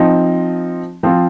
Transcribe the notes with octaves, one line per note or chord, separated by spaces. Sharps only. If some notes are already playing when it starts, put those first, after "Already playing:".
Already playing: F3 C4 D#4
F3 C4 F4